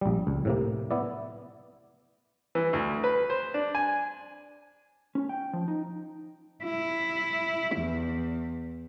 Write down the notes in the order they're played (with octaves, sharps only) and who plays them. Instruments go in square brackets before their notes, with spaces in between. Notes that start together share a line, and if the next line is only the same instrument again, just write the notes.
[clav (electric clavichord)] A#1 G3
C#2
A2 C3 A#3
B3 E4 D5
[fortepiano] E3
D2
B4
C5
D4
G#5
[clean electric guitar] C#4
G5
F3
D#4
[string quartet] E4
E2